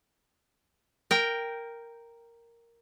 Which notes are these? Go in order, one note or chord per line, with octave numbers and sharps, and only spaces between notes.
A#4 G5